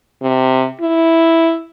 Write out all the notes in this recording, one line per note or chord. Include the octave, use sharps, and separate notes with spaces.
C3
E4